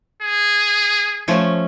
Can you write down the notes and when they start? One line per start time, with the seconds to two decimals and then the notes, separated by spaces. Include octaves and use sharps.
0.23 G#4
1.28 F3 A3 C#4